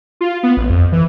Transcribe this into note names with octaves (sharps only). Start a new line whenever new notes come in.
F4
B3
A1
F2
E3